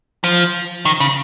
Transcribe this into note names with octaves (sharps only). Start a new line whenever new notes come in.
F3
D#3
C#3